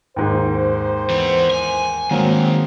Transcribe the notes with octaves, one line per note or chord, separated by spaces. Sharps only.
D#2 G#2 C5
E3 B3
G#5
D#3 F#3 G#3 A#3 C4